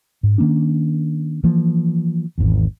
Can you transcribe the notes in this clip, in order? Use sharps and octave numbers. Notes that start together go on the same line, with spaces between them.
G#2
D#3 A#3 C#4 D4
E3 F3 A#3
G#1 E2